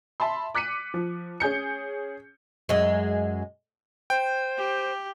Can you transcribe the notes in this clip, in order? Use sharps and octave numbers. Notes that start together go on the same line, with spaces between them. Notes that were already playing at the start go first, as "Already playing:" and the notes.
E5 A5 B5 C6
D6 F#6 B6 C#7 D#7
F3
C#4 G#4 G6 C#7
F#2 G#3
C5 G5
G4